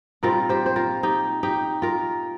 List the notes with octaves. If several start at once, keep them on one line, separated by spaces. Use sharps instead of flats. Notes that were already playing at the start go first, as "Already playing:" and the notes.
A#2 G3 C4 D#4 F4 A#4
G4 C5
C5
F4 A#4
D#4 G4
D#4 G4
F4 A#4